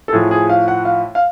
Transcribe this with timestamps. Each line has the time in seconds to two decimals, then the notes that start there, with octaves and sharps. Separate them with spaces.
0.08 A4
0.13 A2 F3 G#4
0.31 G#4
0.50 F5
0.68 F#5
0.85 F5
1.15 F5